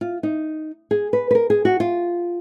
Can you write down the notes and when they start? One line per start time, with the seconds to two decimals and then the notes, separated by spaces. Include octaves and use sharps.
0.01 F4
0.23 D#4
0.91 G#4
1.13 B4
1.31 B4
1.35 A#4
1.50 G#4
1.65 F#4
1.80 F4